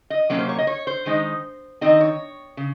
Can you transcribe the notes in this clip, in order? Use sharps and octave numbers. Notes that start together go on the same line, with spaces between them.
D#5
C3 F#3 A#3 C#4 C#5
C5
C#5
D#5
C#5
C5
D#3 G#3 D#4
D#3 G#3 C4 D#4 D#5
C#5
C#3